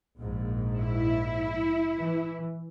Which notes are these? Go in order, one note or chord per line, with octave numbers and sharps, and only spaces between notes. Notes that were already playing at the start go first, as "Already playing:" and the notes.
A#1 G#2
E4
E3